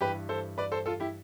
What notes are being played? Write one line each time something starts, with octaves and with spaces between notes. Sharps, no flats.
G2 E3 G4 B4
A4 C5
B4 D5
A4 C5
F4 A4
E4 G4